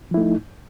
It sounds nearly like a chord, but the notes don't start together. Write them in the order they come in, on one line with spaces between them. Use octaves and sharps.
F3 E4 A3 D#4